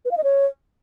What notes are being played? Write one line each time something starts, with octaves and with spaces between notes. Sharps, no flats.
B4
F5
D#5
C#5